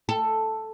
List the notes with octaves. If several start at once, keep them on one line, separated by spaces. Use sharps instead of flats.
A4